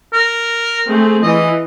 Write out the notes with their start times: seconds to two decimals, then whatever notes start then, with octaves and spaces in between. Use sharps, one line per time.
0.13 A#4
0.87 A3 C4 G#4
1.23 E3 D#5